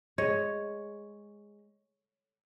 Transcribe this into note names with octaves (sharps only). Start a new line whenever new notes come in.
G#3 C#5